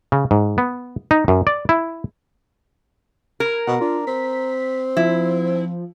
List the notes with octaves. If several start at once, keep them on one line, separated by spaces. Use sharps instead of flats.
C#3
G#2
B3
D#4
F#2
D5
E4
A#4 G#6
B2 F#5
D4 F4
C4 B6
F3 E4